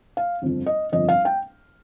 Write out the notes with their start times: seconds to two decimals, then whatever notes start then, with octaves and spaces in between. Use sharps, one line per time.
0.17 F5
0.42 G1 F2 F3
0.66 D#5
0.92 G1 F2 F3 D#5
1.09 F5
1.25 G5